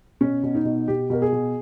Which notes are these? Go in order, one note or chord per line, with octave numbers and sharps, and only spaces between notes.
B2 C#4
B2
D#4
B2
B2 G4
B2 A#4
G#4
B2